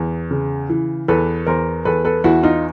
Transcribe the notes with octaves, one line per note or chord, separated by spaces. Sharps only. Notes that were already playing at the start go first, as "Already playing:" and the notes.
Already playing: E2
C#3
E3
E2 A4 B4
E2 A#4 C5
E2 A4 B4
A4 B4
E2 E4 F#4
D#4 F4